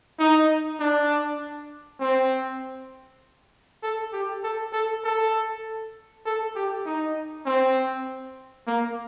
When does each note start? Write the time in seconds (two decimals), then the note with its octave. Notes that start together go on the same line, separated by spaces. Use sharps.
0.19 D#4
0.80 D4
2.00 C4
3.83 A4
4.13 G4
4.43 A4
4.73 A4
5.04 A4
6.26 A4
6.56 G4
6.86 D#4
7.46 C4
8.67 A#3